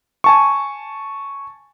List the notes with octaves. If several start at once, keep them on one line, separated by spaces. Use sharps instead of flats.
G#5 A5 C#6